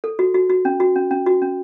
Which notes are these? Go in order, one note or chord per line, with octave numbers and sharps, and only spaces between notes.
A4
F#4
F#4
F#4
C#4
F#4
C#4
C#4
F#4
C#4